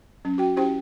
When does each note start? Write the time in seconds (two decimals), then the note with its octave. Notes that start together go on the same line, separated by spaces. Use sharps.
0.25 F#3 C#4
0.38 F#4 G5
0.57 C#4 E4 G4 C5 G5